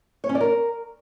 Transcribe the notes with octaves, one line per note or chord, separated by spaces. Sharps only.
C#5
C#4
D5
A#4